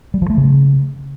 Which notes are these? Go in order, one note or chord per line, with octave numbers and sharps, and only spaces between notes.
G3
F3
A3
C#3